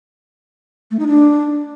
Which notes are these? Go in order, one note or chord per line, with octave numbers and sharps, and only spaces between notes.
A3
D#4
D4